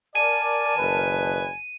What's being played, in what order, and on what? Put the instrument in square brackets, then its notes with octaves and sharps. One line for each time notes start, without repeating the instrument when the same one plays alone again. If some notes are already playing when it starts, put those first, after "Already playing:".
[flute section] A#4 A5 [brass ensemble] D5 [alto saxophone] G#5 [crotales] D#7
[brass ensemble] F#1 D#3 B4